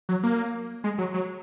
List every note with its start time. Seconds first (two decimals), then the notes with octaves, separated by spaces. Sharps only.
0.09 F#3
0.23 A#3
0.84 G#3
0.98 F#3
1.14 F#3